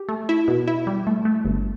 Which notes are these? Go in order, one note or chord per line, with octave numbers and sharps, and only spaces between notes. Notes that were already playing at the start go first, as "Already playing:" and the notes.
Already playing: G4
A3
E4
B2
E4
G3
A3
A3
G1